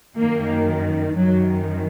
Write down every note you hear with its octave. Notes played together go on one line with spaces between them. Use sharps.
F#2 D#3 A#3
F#2 D#3 F#3